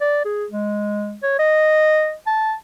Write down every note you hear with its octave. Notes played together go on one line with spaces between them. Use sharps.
D5
G#4
G#3
C#5
D#5
A5